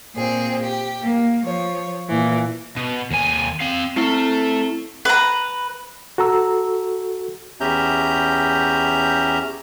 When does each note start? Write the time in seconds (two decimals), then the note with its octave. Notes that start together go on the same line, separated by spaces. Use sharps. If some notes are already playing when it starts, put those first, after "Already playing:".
0.16 A#2 C4 G#4
0.63 G4
1.03 A#3
1.44 F3 C#5
2.08 A#2 E3
2.76 B2
3.11 D#2 G#5
3.60 C4 F5
3.96 A3 C4 E4 A4 C7
5.05 B4 A#5
6.18 F#4 A4 A#5 E6
7.61 E2 C#4 G4 E5 A#5 G6